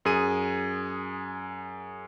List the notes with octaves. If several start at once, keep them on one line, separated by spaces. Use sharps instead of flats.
F#2 G#4 D#7